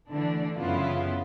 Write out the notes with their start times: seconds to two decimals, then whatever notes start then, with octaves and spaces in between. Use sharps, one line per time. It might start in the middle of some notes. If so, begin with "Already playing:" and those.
0.12 D3 E3 A3 D4
0.57 F#2 C#3 B3 E4 F4